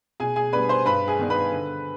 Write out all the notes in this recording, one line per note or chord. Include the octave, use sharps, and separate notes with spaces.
B2 G#4 G#5
G#4 G#5
G3 B3 D4 B4 B5
C5 C6
G2 B4 B5
G#4 G#5
D#3 B3 D4
B4 B5
D3